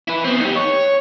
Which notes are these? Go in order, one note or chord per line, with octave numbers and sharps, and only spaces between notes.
E4 B4
B3 C4
D#4 G4
C#5